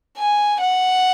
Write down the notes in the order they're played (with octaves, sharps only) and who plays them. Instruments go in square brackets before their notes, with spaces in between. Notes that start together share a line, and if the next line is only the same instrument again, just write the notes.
[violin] G#5
F#5